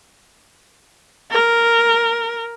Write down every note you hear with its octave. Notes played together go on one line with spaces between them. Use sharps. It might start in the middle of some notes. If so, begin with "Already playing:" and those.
A#4